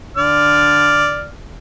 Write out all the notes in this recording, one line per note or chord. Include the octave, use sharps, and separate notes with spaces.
D3 D5 F6